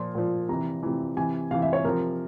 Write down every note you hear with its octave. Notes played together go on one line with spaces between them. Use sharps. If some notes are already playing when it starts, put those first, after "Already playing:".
Already playing: A#2 F3 C6
A#2 F3
C3 E3 A#5
C3 E3
C3 E3 G#5
C3 E3 F5
E5
C#5
C3 F3 A#4